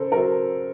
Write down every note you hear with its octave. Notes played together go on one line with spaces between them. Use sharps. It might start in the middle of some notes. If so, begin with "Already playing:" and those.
Already playing: C#3 A4 A#4 C5
F#3 A#4